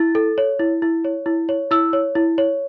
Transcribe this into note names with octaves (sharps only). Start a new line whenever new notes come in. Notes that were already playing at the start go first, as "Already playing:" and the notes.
Already playing: E4 A6
A4
C#5
E4
E4
C#5
E4
C#5
E4 E6
C#5
E4
C#5